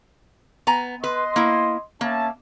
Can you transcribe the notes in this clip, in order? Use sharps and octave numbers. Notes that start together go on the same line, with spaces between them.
B3 G#5 A#5
B4 D#5 C6
A#3 E4
A#3 C#4 E5 A5